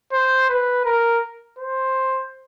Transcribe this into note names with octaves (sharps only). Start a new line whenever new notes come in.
C5
B4
A#4
C5